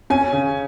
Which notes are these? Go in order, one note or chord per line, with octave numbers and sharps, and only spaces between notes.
C#4 G#5
C#3